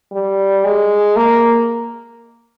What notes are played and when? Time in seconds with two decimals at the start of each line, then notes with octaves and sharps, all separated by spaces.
0.12 G3
0.64 G#3
1.16 A#3